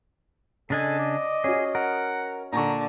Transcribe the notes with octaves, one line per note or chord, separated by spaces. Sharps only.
C#3 D4 A4 D#5 G#5
D5
C#4 F#4 G#4
A#4 F#5
A#2 D3 A#5 C#6